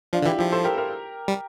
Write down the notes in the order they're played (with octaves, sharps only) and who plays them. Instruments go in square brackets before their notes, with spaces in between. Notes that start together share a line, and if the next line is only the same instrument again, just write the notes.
[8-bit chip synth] F3 [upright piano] D4 F4
[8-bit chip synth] D3
[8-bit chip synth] E3 [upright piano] E4 G4
[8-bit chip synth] F3 [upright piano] E4 G4
[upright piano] A4 C5
G4 A#4
G4 A#4
[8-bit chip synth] G3